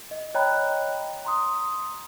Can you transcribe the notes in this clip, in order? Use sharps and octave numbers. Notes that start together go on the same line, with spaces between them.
D#5
C#5 D#5 G5 A#5 B5 F#6
A#5 C6 D#6